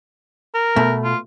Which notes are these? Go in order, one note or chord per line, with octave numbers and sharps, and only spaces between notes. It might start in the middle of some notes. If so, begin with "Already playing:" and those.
A#4
B2 A3
F4